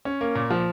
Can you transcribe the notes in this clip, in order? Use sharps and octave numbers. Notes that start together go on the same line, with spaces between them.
C#4
A#3
A#2
F3